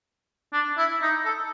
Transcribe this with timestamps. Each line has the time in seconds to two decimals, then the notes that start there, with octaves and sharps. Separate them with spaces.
0.53 D4
0.78 E4
1.02 D#4
1.25 A4